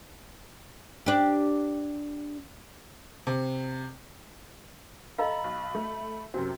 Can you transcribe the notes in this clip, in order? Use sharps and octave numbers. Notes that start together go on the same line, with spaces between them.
D4 G4
C3
A4 D#5 F5 A#5 B5
B1
A3
F#2 C3 C4 F#4